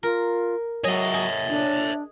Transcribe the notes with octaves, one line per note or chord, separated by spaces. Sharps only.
F4 A#4
F#3 G#4 C#5 D#5 E5
G#4
D4